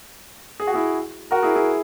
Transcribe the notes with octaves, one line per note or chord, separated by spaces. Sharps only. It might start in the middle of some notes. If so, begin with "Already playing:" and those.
G#4
F#4
E4 G#4
F#4 A#4
E4 G#4
E4 G#4